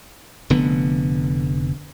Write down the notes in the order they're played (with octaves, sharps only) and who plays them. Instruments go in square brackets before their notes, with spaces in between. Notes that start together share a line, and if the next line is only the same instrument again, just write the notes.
[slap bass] F1 D3 B3